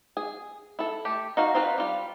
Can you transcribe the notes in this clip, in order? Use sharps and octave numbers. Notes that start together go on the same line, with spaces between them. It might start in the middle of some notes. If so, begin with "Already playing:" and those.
G#4
E4 A4
A3 G4
D#4 F#4 F5
C4 D#4 F4 B4
G3 F4